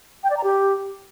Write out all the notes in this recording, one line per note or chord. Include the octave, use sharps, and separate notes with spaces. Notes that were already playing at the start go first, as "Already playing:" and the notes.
G5
D5
A#5
G4